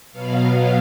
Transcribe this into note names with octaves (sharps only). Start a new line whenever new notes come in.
B2 F#3 B3 F5